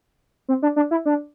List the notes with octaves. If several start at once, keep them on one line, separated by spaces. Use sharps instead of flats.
C4
D4
D4
E4
D4